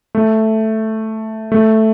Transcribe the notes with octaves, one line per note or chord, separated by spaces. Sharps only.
A3
A3